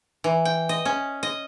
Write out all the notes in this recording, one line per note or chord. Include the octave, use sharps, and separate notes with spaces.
E3
G5
D#5
C#4
D#5